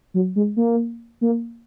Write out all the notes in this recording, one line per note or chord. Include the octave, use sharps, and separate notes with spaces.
F#3
G#3
A#3
A#3